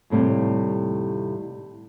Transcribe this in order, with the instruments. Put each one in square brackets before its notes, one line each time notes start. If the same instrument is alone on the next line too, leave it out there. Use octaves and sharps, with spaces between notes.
[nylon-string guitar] D#2 A2 C3 G3